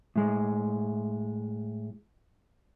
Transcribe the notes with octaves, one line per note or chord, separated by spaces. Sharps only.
A2 G#3